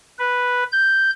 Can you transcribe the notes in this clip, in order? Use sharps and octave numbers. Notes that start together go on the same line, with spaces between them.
B4
G6